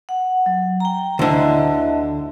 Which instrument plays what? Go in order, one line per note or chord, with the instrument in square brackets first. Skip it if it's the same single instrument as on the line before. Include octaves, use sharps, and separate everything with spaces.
[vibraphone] F#5
F#3
G5 A#5
[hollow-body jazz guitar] D2 D3 [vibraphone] E4 D#5 E5